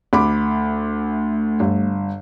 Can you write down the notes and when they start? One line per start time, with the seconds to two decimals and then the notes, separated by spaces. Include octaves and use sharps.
0.13 D2 A3 B5 D6
1.60 G1